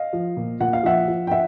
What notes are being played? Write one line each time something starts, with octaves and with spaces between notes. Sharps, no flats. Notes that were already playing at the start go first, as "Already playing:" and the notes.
Already playing: D#5 F5
F3
A#2
A#2 F#5
F5
F3 E5 F#5
F3
G5
E5 F#5